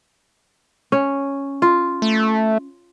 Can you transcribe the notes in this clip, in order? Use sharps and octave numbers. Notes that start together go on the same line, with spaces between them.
C#4
F4
A3